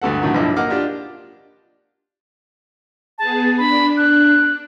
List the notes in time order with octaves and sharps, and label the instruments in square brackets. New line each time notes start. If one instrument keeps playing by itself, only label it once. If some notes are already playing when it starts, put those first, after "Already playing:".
[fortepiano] D2 G2 A4 F#5
A2 D3 D#3 F#3
B1 G2 F3 E4 D#5 D6
A#3 D#5 F#5 D6 F6
D4 F4 G4
[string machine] B3 G#4 [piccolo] A5
[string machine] D4 [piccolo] B5
[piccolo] F#6